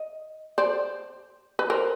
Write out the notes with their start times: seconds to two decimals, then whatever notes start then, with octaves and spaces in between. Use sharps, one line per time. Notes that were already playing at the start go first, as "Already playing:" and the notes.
Already playing: D#5
0.58 C5 D5
1.59 B4
1.70 A#4 C5